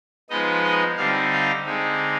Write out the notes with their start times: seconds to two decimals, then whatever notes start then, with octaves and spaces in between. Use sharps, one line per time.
0.30 F3 G#3 B3 D#4 D#5
0.64 D#5
0.97 D3 G3 C4 D#4 F5
1.32 F5
1.66 D3 G#3 C4 D#4